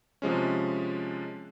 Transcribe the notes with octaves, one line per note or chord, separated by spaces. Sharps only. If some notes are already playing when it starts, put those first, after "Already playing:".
C3 F3 G#3 C#4